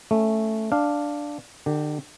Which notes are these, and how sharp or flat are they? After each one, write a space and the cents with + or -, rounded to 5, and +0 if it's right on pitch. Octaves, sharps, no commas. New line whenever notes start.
A3 +0 C#4 +0
D4 +0 F5 +0
D3 +40 G4 +0